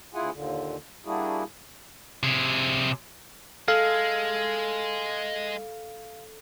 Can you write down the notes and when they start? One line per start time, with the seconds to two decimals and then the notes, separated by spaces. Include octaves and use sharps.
0.14 D2 E4 F4 G#4 F#5 G#5
0.33 D#2 A#2 D3
1.05 G3 A#3 D4 E4 F#4 G#4
2.23 C3 G#4
3.68 G#3 A4 F5